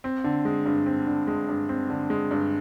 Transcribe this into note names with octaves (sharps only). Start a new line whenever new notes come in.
C4
D3
G#3
G2
C4
D3
G#3
G2
C4
D3
G#3
G2